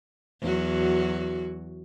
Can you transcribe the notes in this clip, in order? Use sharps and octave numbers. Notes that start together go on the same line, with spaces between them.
E2 F#3 F#4